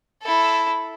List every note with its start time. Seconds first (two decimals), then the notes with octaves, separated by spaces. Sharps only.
0.23 E4 A4